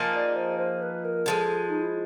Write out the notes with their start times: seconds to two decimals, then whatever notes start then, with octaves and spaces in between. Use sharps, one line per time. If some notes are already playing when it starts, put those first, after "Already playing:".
Already playing: F3 A#3 D#4 G#4
0.13 D5
0.36 C5
0.59 C5
0.82 B4
1.04 A#4
1.26 D3 F3 G#3 A4
1.69 D#4
1.82 E4